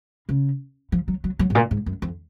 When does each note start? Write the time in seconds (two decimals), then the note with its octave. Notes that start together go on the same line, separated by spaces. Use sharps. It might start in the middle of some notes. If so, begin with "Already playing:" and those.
0.29 C#3
0.92 F3
1.08 F#3
1.24 F#3
1.39 F#3
1.50 G#2
1.55 A#2
1.71 G#2
1.86 F#2
2.02 F2